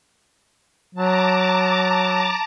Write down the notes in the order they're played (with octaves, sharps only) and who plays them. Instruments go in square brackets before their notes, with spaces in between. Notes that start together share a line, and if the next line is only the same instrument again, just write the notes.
[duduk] F#3 [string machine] A5 A#5 D6